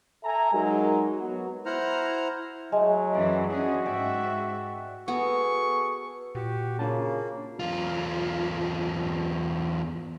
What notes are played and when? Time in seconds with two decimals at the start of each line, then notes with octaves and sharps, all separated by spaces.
0.24 A4 E5 G#5 A#5
0.53 F#3 G#3 D#4 F#4 A#4
1.18 F#3 B3 F#4
1.66 E4 C5 F#5 A#5 F6
2.72 F#3 G#3 A3
3.14 F#2 E3 C#4 D5
3.49 C#4 D4 F#4 G#4
3.86 G#2 D5 E5 G5
5.08 B3 F#4 G#4 A4 C#6
6.35 A#2 F#4 G4
6.79 C#3 A#3 D4 F4 A5
7.60 E2 F4